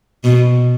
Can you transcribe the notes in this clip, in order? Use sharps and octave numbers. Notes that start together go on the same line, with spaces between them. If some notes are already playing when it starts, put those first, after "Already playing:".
B2